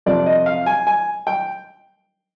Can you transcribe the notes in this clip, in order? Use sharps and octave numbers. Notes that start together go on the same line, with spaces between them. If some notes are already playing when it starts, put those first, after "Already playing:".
F2 C3 F3 D5
D#5
F5
G#5
G#5
G5